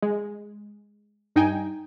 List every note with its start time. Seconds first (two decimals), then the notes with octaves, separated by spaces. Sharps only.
0.02 G#3
1.36 G2 D#4 G5 G#5